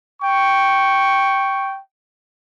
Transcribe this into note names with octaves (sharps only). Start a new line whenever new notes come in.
G5 C#6